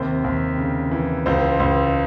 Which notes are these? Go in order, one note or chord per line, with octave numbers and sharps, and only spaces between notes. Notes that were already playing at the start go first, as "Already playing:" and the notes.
Already playing: D#2 C3 C5
D#2
C#3
E3
C#2 C5
C#2